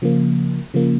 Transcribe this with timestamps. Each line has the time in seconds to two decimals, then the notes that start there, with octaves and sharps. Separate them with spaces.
0.02 C#3 F3 A#3
0.74 C#3 F3 A#3